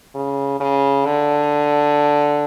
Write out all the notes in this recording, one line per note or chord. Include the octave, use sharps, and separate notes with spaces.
C#3
C#3
D3